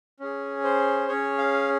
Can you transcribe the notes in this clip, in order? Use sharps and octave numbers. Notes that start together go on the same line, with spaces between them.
C#4 G#4
C5
C#4 G#4 C#5
F5